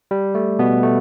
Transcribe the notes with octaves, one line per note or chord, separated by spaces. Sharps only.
G3
A3
B2 B3
A3